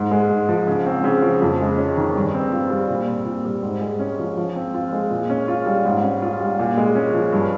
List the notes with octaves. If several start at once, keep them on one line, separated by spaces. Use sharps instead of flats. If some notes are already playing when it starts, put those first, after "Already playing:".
Already playing: G#2
G#3
G#2
F3
C#3
C4
C#3
F3
F2
G#3
C#4
D#3
G2
C4
F4
G3
A#2
C4
A#2
G3
G#2
G#3
C#4
F3
F3
C4
F4
G#3
A#2
C#4
F4
G3
G#2
C#4
F4
G3
A#2
G#3
C#4
F3
G2